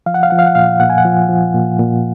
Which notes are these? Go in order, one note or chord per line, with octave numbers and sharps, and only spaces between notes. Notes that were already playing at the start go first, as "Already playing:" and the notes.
F3 F5
F#5
F5
F3 F#5
F5
F#5
A#2 F5
A#2 F#5
G#5
F#5
F3
F3
A#2
A#2